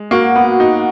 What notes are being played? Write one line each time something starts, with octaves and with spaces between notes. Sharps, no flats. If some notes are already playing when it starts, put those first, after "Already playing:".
Already playing: G#3
A#3 F#4
B3
D#4